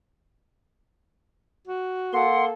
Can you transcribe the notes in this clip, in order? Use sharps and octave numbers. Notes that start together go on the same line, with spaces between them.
F#4
A#3 A4 F#5 C6